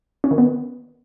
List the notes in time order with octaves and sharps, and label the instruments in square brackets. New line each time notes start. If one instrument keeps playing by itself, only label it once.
[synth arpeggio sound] C#4
D#3
B3